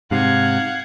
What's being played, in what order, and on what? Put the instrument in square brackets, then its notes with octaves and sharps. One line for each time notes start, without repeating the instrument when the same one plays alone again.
[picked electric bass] G#2 C3 [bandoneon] F5 [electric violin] F#5 G#6